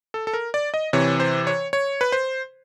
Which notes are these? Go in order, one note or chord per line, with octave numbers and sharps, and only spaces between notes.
A4
A4
A#4
D5
D#5
C3 E3 C#5
C5
C#5
C#5
B4
C5